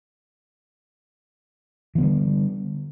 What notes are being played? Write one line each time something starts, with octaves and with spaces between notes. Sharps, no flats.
D3 E3 G3 B3